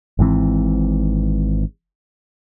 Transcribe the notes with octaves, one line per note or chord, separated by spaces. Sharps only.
G#1 G#2 E3 C4